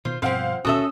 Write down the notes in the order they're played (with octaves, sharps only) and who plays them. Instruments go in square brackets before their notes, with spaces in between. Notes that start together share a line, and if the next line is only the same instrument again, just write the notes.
[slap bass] B2 D#3 B3 [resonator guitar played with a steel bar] F4 C5
[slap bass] G2 B2 G3 [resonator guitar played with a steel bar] F3 C4 [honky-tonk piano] C5 F5 F#5
[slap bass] D#1 B2 [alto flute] C#4 [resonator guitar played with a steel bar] F#4 A4 E5 [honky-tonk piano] D#6 E6